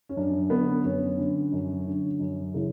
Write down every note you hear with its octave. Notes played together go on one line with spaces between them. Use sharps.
C#4
F#2 D4
D3 B3
F#2 C#4
D3
F#2
D3
F#2
C#3 E3